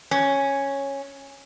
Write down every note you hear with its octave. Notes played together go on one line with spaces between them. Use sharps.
C#4